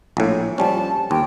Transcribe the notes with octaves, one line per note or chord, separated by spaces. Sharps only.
A#1 A2
F3 G3 C#4 A5
D#2 G5